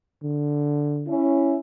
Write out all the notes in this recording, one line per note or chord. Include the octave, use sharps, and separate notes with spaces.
D3
C#4 E4